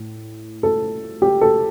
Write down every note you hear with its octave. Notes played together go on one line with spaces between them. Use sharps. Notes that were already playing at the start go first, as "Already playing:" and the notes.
Already playing: A2
A4
G4
A4